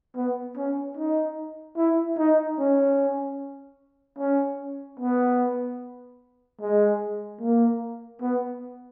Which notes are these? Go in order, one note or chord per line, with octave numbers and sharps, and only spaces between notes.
B3
C#4
D#4
E4
D#4
C#4
C#4
B3
G#3
A#3
B3